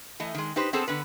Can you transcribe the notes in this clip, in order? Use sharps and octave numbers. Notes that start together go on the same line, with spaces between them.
E3 A3 D#5
D#3 G#3
D#4 G4 B4 C5
B3 C4 G#4 A4 C5 A5
D3 B3 B4